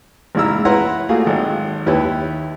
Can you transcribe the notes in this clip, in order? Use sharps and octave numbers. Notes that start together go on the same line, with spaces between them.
A1 G#2 C#3 E4 A#5 E6
E4 B4 C#5 F#5 A#5 C6
A3 A#3 F4 F#4 G#4
G#1 F#3
D#2 E4 G4 B4 C#5